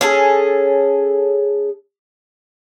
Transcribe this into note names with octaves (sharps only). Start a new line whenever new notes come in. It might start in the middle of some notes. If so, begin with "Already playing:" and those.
C#4 G#4 A4